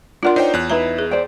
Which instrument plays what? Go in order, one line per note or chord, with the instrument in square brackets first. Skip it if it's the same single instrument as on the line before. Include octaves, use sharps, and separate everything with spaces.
[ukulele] D4 A#4 D5 [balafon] F4 F#5 C6
[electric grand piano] D#4 C5 G5 [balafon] C#5
[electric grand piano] E2 F#6
[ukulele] D#4 E4 B4 [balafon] A#5
[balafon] G#4
[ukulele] C5 D5 G5